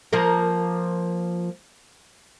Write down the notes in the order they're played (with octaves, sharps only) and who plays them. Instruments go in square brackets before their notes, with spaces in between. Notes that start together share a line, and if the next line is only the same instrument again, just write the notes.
[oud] F3 A#3 A#4